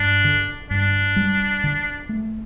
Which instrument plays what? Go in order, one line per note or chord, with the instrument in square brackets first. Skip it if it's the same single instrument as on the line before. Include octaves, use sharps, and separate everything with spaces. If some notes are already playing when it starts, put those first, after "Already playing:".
Already playing: [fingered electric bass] G2 [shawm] D4
[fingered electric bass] D3
[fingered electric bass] G2 [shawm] D4
[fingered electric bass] G3
D3
A3